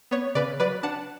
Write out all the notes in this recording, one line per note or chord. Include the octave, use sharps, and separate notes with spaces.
B3 C#5
C#3 B4 D5
F#3 B4 D5
D4 F#5 A5